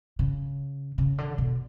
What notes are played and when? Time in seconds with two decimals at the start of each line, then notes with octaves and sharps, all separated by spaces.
0.19 C#3
0.98 C#3
1.18 D3
1.38 B2